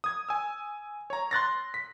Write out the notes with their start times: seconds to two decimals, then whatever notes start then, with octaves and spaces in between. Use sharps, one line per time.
0.04 D#6 G#6
0.29 G#5 E6
1.10 C#5 A#5
1.31 C6 F#6 A6 A#6
1.74 B6